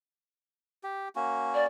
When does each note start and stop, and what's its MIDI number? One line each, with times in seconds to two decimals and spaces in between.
0.83 1.08 67
1.16 1.66 58
1.16 1.66 61
1.16 1.66 66
1.54 1.63 74